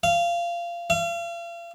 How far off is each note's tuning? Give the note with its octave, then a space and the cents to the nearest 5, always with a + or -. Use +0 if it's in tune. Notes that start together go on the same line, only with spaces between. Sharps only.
F5 -20
F5 -40